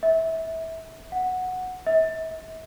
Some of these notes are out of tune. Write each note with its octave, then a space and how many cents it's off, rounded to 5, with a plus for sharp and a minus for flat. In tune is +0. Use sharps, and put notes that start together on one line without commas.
E5 -25
F#5 -5
E5 -45